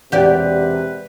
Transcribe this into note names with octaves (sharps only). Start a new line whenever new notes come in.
E1 C3 G4 B4 D5 F#5 G6